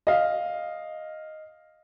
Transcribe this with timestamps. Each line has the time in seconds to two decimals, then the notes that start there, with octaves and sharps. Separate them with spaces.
0.07 D#5 F5